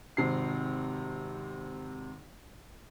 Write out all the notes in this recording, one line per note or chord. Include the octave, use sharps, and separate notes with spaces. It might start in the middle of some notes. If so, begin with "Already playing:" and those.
G#1 C3 C7